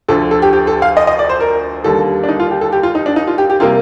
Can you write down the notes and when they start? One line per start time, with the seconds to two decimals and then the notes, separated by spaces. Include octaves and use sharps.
0.08 D2 D3 F3 A4
0.31 A4
0.42 G4
0.53 G4
0.67 A4
0.82 F5
0.97 D#5
1.07 D#5
1.19 D5
1.29 C5
1.40 A#4
1.84 D#2 D3 G3 A#3 A4
2.24 D4
2.29 D#4
2.40 F4
2.51 G4
2.61 A4
2.72 G4
2.83 F4
2.95 D#4
3.06 D4
3.16 D#4
3.27 F4
3.38 G4
3.50 G4
3.60 C3 G3 A#3 F4